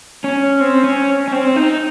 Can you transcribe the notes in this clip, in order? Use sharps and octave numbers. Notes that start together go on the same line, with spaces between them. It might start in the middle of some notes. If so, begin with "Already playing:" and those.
C#4
C4
C#4
C#4
C4
D#4